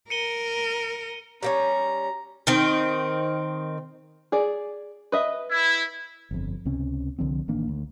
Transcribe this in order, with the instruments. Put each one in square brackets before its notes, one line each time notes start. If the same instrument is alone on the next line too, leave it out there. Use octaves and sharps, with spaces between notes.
[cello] A#4 [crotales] C#7 D#7 G7
[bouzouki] G3 A#3 C#4 [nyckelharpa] A#5
[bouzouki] D#3 C4
[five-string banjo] G#4 D5
B4 D#5 E5
[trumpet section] E4
[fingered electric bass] G1 F2
C#2 C3 C4 C#4
C2 D3 F3 C4
A1 D#3 A#3 D4
D2